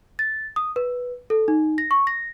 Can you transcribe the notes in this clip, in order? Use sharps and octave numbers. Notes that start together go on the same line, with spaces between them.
A6
D#6
B4
A4
D#4
A#6
C#6
A#6